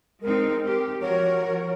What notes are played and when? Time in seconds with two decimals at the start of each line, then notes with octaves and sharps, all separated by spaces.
0.22 G#3 C4 D#4 A#4
0.66 G4
1.01 F3 F#4 A#4 C#5